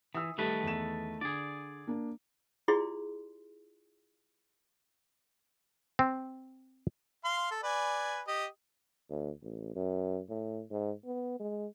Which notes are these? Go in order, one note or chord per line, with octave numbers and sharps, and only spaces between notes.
E3 D#6 E6
D#3 G3 A3 A4 B4
E2 E7
D3 G#4 D5
A#3 D4
E4 F4 G4 G#4 D5 C6
C4
F5 C6
A4
B4 D5 G#5
G4 D#5 D#6
D2
A1
F#2
A2
G#2
B3
G#3